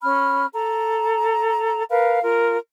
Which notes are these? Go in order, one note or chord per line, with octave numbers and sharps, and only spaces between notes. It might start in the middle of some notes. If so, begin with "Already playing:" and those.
C#4 B5 F6
A4 A#5
A#4 B4 F5
F4 A#4